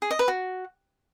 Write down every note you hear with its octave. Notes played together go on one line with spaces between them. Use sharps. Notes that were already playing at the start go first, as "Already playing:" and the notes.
G#4
D#5
B4
F#4